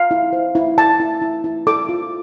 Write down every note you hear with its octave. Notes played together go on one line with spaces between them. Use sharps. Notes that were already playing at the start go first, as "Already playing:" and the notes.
Already playing: F5
E4
C5
E4
E4 A5
E4
E4
E4
A4 D6
F4